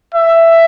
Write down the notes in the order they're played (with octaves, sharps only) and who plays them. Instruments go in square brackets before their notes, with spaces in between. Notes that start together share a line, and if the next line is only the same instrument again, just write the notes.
[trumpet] E5